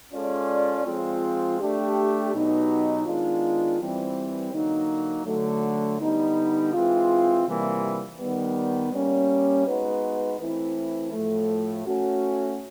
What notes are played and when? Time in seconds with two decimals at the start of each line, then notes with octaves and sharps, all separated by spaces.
0.13 G#3 C#4 F4 A4 D5
0.86 F3 G#3 C4 F4
1.59 A3 D4 G4
2.33 B2 F#3 B3 D#4 G4
3.06 D#3 G#3 B3 D4 F4
3.79 E3 G3 C4
4.53 D3 F#3 A#3 D#4
5.26 D3 F#3 A3
6.00 D3 G3 B3 D#4
6.73 E3 G#3 C4 F4
7.46 C3 E3 G3 A#3
8.20 D#3 G3 B3
8.92 G3 A#3 C#4
9.66 G#3 B3 D#4 F#4 B4
10.39 E3 A3 C4 E4
11.13 A2 F3 A3
11.86 A3 C#4 F#4